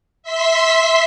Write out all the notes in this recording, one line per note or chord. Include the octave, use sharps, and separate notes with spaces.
E5 C6 B6